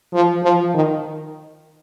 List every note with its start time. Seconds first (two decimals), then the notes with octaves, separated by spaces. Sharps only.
0.13 F3
0.43 F3
0.74 D#3